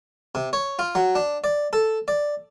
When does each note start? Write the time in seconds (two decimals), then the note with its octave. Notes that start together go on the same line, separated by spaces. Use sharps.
0.35 C3
0.53 C#5
0.79 F4
0.95 F#3
1.15 D4
1.44 D5
1.73 A4
2.08 D5